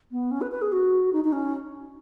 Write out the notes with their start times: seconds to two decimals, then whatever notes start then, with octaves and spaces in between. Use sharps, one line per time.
0.11 B3
0.31 C#4
0.41 B4
0.51 B4
0.61 G#4
0.72 F#4
1.12 D#4
1.24 D#4
1.32 C#4